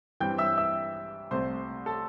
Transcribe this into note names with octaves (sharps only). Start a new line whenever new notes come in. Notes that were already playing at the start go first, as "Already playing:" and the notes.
G2 E3 G3 C4 G5 G6
E5 E6
E5 E6
C2 C3 A3 C4 C5 C6
A4 A5